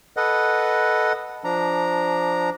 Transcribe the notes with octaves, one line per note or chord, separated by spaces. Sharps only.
A4 B4 D#5 F#5
F3 D4 A#5